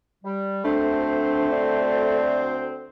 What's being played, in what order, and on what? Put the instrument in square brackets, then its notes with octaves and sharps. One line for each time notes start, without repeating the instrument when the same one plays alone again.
[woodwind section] G3
[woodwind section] D2 C4 C5 [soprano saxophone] A3 [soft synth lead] D4
[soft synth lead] D5